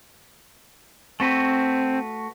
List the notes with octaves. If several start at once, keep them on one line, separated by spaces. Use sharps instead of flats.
A3 C4 F#4 B4